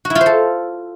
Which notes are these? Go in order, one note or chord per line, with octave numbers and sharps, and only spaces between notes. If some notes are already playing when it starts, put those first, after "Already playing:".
F#4
E4
F4
C5
A4